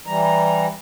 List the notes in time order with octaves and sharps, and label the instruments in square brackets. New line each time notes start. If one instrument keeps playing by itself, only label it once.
[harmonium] E3 G3 A#5